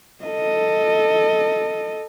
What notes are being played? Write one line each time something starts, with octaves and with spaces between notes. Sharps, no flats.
A4 D#5